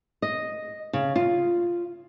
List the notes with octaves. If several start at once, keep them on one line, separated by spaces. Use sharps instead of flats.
D#5
C#3
F4